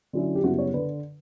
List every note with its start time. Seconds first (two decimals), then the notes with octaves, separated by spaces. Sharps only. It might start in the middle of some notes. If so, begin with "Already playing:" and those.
0.13 D3 F#3 C#4 E4
0.35 G4
0.44 F#2 C#3 G3 B3 E4 F#4
0.59 C#5
0.74 D3 B4